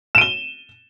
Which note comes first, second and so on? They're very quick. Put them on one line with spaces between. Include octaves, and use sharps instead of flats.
E7 D#7 G7